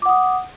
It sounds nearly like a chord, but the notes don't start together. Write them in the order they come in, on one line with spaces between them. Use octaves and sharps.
D6 F#5 D#6